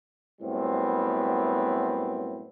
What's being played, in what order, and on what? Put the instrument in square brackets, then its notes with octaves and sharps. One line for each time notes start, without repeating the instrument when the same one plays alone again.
[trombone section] F#2 A2 G3 B3 C4